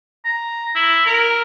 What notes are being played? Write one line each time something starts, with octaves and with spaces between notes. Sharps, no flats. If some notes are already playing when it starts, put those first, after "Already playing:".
A#5
E4
A#4